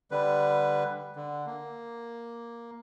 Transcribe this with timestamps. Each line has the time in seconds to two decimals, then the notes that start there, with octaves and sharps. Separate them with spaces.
0.11 D3 G3 B4
1.16 D3
1.47 A#3